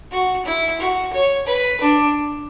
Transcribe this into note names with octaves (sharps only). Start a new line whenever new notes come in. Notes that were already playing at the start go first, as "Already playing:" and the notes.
F#4
E4
F#4
C#5
B4
D4